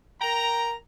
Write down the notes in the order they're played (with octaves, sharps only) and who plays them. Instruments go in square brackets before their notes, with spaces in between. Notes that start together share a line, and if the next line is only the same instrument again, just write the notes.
[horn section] A#4 G5 A#5